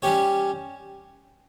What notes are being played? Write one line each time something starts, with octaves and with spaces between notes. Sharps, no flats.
G3 C#4 G4 C#5